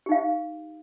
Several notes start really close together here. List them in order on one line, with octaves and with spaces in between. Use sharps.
G4 D#4 F5